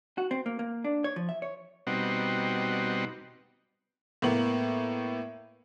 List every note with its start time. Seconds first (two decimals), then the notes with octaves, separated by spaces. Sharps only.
0.18 F#4
0.31 C4
0.46 A#3
0.59 A#3
0.84 D4
1.04 C#5
1.16 F3
1.29 E5
1.42 C#5
1.87 B2 G3 C4 D#4 F#4
4.22 A2 A#3 B3 F#7